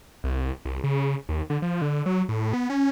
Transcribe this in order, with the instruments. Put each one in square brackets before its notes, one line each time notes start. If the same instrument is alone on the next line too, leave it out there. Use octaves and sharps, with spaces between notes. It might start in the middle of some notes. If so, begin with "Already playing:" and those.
[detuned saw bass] C2
C2
C#3
D#2
D3
F3
D3
F#3
A2
B3
C#4